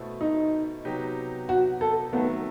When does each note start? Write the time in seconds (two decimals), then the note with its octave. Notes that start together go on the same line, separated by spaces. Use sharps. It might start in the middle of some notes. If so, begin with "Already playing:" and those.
Already playing: B2 A3 E4 A4 C5
0.21 D#4
0.85 C3 F#3 B3 D#4 G4
1.49 F#4
1.81 A4
2.13 D#3 F#3 A3 B3